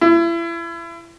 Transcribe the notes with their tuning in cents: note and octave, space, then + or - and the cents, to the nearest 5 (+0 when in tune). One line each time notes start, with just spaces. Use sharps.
E4 +35